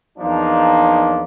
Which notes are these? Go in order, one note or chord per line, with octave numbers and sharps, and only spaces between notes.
E2 F3 A#3 D4 D#4